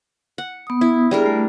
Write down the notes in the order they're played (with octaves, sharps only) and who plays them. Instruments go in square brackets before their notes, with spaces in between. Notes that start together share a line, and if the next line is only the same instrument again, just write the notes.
[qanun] F#5
[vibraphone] B3 D#6
[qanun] E4
[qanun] G3 D4 A#4 [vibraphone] G#4
[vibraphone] A3